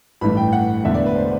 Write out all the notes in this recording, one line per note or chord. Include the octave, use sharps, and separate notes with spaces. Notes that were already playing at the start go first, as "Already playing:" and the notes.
A1 G2 E3 A3 B5
G5
F#5
E1 E2 D3 A3 E5
D5
B4
C5